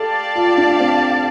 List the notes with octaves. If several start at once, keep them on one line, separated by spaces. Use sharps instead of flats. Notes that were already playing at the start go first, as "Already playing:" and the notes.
Already playing: G4 A4 D5 F5 A5
F4
D4
C4